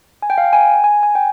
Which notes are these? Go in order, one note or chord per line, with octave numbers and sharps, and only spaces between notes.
G#5
G5
F5
G5
G#5
G#5
G#5
G5